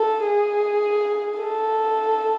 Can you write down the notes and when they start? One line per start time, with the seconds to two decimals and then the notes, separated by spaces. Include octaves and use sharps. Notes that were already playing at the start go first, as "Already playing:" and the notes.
Already playing: A4
0.26 G#4
1.40 A4